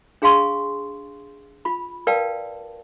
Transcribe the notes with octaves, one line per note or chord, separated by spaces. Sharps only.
D4 G#4 F5 G#5 C6 C#6
F4 B5
A#4 B4 D5 F5 G5 A5